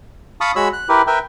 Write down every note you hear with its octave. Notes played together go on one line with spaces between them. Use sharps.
F5 A5 B5 C#6 D#6
G#3 F#4 C#5 B5 E6
F#6
E4 G4 A#4 B4
A#4 B4 E5 G5